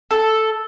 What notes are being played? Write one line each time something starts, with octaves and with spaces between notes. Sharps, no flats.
A4